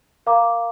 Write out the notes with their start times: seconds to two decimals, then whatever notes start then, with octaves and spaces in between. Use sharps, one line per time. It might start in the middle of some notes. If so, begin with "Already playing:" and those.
0.26 A#4 F5 A#5 D6